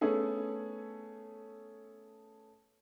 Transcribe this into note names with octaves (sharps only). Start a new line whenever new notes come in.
A3 B3 C#4 G#4 A4